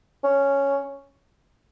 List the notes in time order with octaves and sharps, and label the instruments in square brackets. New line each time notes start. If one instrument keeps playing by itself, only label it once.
[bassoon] C#4